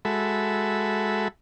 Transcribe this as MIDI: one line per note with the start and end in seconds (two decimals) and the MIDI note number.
0.05 1.28 56
0.05 1.28 66
0.05 1.28 69
0.05 1.28 76
0.05 1.28 83